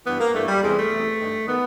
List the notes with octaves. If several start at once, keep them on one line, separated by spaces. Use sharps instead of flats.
G2 E3 B3
A#3
G2 E3 A3
G3
E2 C3 E3 G#3
A3
E2 C3 E3
G2 D#3
D#3 B3